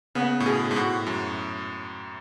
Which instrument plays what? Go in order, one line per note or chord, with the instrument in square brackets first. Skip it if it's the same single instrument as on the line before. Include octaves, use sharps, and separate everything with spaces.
[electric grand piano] C#3 [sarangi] B3
[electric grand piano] A2
[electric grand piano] B2 [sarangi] G#4
[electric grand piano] G#2
[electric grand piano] A2 [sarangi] F#4
[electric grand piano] F#2